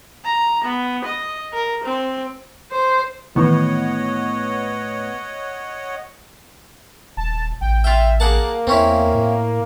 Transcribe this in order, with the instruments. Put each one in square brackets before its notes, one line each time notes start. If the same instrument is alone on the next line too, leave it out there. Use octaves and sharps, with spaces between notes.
[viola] A#5
B3
D#5
A#4
C4
C5
[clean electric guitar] A2 [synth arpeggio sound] D#3 E3 [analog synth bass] B3 [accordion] C#5 D#5 F#5
[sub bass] D#1 [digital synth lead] A5
[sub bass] A1 [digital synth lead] G5
[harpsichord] F4 G5 [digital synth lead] E5
[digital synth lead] A#3 [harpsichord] G#4 F#5 A5
[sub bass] E2 [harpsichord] C4 C#4 E4
[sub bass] A2